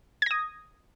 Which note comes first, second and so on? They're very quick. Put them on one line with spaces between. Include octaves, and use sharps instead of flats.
G#6 A#6 D#6